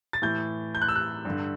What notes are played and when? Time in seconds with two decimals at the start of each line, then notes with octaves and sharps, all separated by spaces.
0.13 A6
0.22 A2 E3 G6
0.75 G6
0.82 F#6
0.88 E6
0.95 F#6
1.25 G2 D3